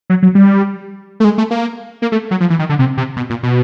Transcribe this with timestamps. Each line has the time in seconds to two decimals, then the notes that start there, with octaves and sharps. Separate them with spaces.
0.10 F#3
0.23 F#3
0.35 G3
1.20 A3
1.24 G#3
1.38 A3
1.51 A#3
2.02 A#3
2.12 A3
2.31 F#3
2.40 F3
2.50 E3
2.59 D#3
2.69 D3
2.79 C3
2.97 C3
3.17 B2
3.30 A#2
3.43 B2